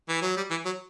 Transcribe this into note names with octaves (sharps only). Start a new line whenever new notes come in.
E3
F#3
G3
E3
F#3